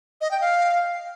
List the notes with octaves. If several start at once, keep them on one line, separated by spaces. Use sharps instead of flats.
D#5
G5
F5